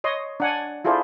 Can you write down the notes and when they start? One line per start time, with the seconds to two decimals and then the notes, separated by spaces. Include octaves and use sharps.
0.04 C#5 D#5 C6
0.40 D4 F#5 G#5
0.85 E4 F4 G#4 A4 C5 D5